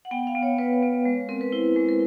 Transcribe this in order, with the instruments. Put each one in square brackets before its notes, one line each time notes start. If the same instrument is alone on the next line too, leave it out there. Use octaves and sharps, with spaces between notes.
[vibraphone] F#5
B3 G5
F5
B3
C#5
B3 B4
B3
G#3
C4 A#4
B4
E4 C5
G#3
A#4